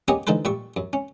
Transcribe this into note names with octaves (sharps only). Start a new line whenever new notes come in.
A#3 B3 C#4 G4 G#4 D#5
D3 E3 D#4 A4 B4 C5
A#2 G3 E5 C#6
F#2
C#4